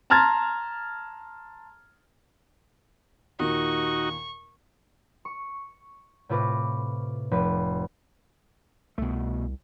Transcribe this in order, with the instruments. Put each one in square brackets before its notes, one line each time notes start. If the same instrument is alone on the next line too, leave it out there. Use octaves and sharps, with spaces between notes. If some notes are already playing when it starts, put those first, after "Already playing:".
[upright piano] A5 A#5 C6 F6 G#6 A6
[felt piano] D#2 A#2 [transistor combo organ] D#4 F#4 [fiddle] C#6
[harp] C#6
A2 C3 F4 B4 D6 A#6
F1 B4
[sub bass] C2 [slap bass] B2 A3